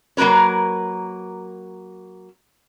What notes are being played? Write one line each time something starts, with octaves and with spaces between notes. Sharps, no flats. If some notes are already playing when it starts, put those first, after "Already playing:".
F#3 A#3 A#4 B4 C#5